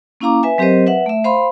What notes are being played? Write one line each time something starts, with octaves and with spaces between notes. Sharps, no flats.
A#3 C#4 E4 F5 A#5 D6
B4 E5 G#5
F#3 C4 G4 A#4 C5 D#5
B4 E5 F#5
A3 E5
C5 F5 B5 C6